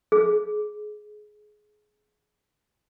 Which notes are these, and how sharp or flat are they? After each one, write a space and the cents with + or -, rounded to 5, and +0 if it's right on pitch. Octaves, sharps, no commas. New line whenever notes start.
G#4 +20